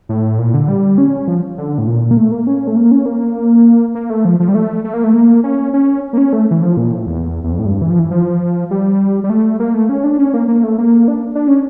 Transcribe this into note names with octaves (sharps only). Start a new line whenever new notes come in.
A2
A#2
D3
G3
C#4
F3
D3
A2
A#2
A#3
A3
A#3
C#4
A3
A#3
C#4
A#3
A#3
A3
F3
F3
G3
A3
A3
A#3
A3
A#3
C#4
C#4
A#3
C#4
A3
E3
F3
A#2
A2
E2
E2
F2
A2
G2
E3
F3
E3
F3
G3
G3
A3
A#3
A3
C#4
D4
C#4
A#3
A#3
A3
A#3
D4
D4
C#4